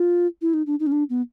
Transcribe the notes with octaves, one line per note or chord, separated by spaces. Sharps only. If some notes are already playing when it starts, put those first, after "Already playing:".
Already playing: F4
E4
D#4
D4
D#4
C#4
D4
B3